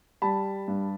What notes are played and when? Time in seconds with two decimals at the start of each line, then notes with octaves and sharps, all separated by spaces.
0.22 G3 A5 B5
0.68 G2